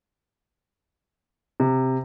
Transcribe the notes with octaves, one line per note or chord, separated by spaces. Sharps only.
C3